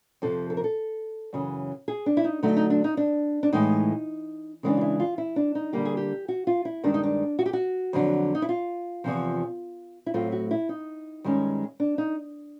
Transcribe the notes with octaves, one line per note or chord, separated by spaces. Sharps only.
F2 C3 F3 A4
A4
A#4
A4
F#2 C#3 E3
G#4
D4
E4
D#4
D3 F#3 A3 D#4
D#4
D4
D#4
D4
D4
A2 E3 G#3 D#4
C#3 E3 G#3 B3 D4
F4
E4
F4
E4
D4
D#4
D3 G3 A#3 G4
G#4
G4
F#4
F4
E4
G2 D#3 G#3 D4
D#4
D4
F#4
G4
F#4
F2 D3 F#3
D#4
E4
F4
E2 C3 F3
E4
A2 F#3 A3 C4 F4
F#4
E4
D#4
G2 D#3 G#3 C#4
D4
D#4